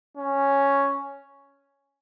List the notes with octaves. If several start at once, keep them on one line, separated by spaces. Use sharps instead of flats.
C#4